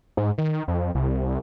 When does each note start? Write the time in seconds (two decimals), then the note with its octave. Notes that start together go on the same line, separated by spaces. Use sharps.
0.17 G#2
0.38 D#3
0.68 F2
0.95 C2